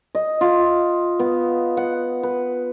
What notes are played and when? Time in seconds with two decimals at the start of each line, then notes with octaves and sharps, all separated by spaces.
0.15 D#5
0.41 F4
1.19 B3
1.77 F#5
2.23 B4